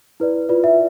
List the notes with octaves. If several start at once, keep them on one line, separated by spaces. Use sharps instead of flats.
E4 B4 D5
F4 B4 D5
E5